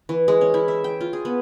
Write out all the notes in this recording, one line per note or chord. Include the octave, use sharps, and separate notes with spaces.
E3
G#3
C#4
E4
E5
G5
F4
G#4
B3